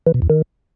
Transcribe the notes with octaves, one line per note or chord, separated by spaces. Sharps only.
E3
B2
E2
D#3